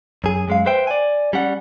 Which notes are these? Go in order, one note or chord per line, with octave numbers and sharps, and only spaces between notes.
F#2 G#4
F#2 G#3 F5
B4 C5 E5 G5
D5 G#5
G3 C#4 F#5